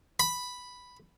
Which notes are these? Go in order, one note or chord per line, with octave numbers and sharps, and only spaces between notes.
B5